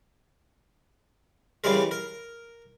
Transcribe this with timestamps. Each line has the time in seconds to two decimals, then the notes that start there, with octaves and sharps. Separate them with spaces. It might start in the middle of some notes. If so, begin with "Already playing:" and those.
1.64 C#3 E3 G3 G#3 A#4
1.91 A#4